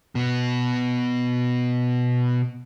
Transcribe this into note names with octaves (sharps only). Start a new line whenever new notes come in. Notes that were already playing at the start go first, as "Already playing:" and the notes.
B2 B3